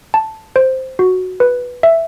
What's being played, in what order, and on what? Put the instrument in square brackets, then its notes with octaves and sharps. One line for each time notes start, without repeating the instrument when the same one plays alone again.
[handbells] A5
C5
F#4
B4
E5